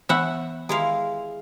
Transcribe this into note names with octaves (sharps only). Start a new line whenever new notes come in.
E3 B3 E5 F#5 B5
D#3 G#3 E4 G4 F5